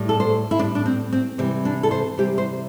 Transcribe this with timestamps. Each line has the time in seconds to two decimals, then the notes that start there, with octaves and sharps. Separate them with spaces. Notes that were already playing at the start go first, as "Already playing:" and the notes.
Already playing: A2 G3
0.09 A4
0.20 C5
0.51 E4
0.59 A2 D4
0.64 G3
0.75 D4
0.86 C4
1.12 C4
1.38 C3 E3 G3 C4
1.65 D4
1.83 A4
1.91 C5
2.17 C3 E3 G3 G4
2.38 C5